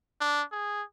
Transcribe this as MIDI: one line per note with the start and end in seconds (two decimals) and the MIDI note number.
0.21 0.43 62
0.52 0.83 68